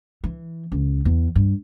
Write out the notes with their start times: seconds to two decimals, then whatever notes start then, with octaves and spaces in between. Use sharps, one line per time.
0.24 E3
0.72 C#2
1.05 E2
1.36 G2